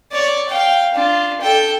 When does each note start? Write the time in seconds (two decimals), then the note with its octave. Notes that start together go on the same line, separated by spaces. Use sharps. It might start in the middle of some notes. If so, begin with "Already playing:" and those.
0.12 C#5 D5
0.49 F5 G5
0.94 D4 F4
1.41 A4 G5